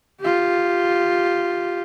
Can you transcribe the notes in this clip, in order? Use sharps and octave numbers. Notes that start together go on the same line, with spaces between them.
F4 G4